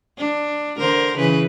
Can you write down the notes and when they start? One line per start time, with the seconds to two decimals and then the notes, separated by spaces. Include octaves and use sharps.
0.18 D4
0.78 D3 A#4 C5
1.17 C#3 E3 B4